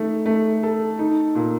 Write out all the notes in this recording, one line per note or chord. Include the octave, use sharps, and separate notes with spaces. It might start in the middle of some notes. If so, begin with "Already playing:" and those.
Already playing: A3 D#4
A3
A4
D#4
A#2